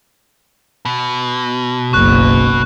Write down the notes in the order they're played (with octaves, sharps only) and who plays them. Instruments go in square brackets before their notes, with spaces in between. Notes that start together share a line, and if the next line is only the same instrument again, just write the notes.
[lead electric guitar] B2
[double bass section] F#1 B1 [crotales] C#6 F#6